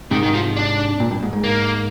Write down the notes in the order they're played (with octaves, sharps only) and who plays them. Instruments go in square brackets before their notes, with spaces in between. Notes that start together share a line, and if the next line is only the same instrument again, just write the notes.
[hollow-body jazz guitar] G#2 C3 [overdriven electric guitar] D#3
[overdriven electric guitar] D#3
F3
D4
[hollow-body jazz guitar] A#2
G2
G#2
G#2
[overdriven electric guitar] A#3